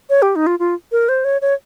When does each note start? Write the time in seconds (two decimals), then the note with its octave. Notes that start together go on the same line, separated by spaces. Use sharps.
0.10 C#5
0.22 G4
0.36 D#4
0.47 F4
0.59 F4
0.92 A#4
1.09 C5
1.25 C#5
1.42 C#5